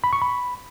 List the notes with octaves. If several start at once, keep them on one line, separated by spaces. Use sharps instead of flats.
B5
C#6
B5